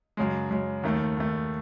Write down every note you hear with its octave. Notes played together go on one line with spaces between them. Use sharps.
F#2 C#3 G#3
F#2 C#3 G#3
D#2 D#3 A3
D#2 D#3 A3